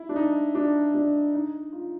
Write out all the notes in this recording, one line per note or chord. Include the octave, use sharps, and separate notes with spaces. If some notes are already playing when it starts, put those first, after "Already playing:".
Already playing: E4
D4
D#4
D4
D4
D#4
F4